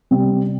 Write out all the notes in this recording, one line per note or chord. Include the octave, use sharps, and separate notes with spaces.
C3 G3 C4